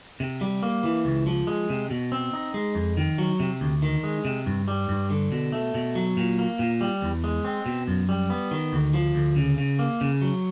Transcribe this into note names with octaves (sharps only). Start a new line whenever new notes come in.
C3
G3
A#3
E3
C#2
F3
G#3
C3
B2
C4
D#4
G#3
F2
D#3
F#3
C3
D2
D#3
G#3
C3
G2
G3
G2
D3
B2
A3
B2
F#3
A#2
A#3
A#2
G3
E2
G#3
C4
B2
F#2
G3
B3
D#3
D2
F3
D2
C#3
C#3
A#3
C#3
F#3